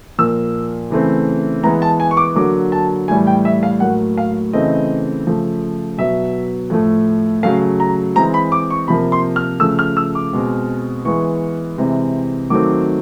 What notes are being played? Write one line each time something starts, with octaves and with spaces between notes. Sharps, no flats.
A#2 F3 A#3 E6
C#3 E3 A3 C4
E3 G#3 B3 A#5
A5
G#5
C#6
D6
D3 F#3 A#3 D6
A5
A2 E3 G3 G#5
G5
E5
F5
A2 F#3 A#3 F#5
F5
C#3 E3 A3 C4 D#5
C#3 F3 A3
B2 F#3 B3 E5
A2 F3 A3
C#3 F#3 A3 F5
A#5
E3 G#3 C4 A#5
B5
D6
C#6
C3 F3 A#3 B5
C6
F6
C#3 F3 A3 E6
F6
E6
D6
B2 G#3 C4
E3 G#3 B3 C#6
C3 E3 G#3 C4
D#3 F#3 A3 C4 D6